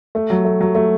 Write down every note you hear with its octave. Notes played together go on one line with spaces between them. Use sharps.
A3
F#3
A3
F#3
A3